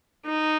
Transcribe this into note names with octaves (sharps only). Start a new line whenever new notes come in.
D#4